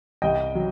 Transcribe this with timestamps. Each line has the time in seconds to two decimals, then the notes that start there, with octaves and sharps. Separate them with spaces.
0.22 C2 D#5 G5
0.55 F#3